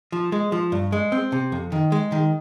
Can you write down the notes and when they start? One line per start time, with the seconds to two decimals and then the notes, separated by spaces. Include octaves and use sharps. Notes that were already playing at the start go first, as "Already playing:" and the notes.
0.12 F3
0.32 G#3
0.52 F3
0.72 G2
0.92 G#3
1.12 C4
1.32 C3
1.52 F2
1.72 D#3
1.92 G#3
2.12 D#3